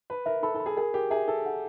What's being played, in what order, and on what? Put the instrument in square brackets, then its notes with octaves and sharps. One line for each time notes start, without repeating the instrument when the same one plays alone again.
[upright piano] B4 [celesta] B5
[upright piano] A#4 [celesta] E5
[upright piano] A4 [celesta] B5
[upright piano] A4
[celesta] B5
[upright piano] G#4
[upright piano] G#4 [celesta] A#4
[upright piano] G4 [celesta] A#4
[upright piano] G#4 [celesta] E5
[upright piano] A4 [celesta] E5
[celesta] F#5